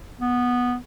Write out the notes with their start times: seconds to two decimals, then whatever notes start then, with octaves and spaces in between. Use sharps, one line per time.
0.19 B3